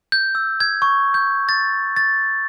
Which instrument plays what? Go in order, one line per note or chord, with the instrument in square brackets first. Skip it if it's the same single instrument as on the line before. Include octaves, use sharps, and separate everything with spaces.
[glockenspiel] G6
E6
G#6
C#6
G6
A6
A6